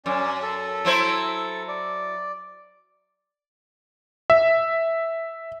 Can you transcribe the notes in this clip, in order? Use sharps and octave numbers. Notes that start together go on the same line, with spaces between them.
F#2 C#4 D5
A4
F#3 E4 C5
D5
E5